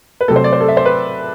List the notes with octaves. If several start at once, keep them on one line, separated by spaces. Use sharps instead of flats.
B4
C3 F#3 A3 A4
C5
D5
C5
A4
E5
C5
B4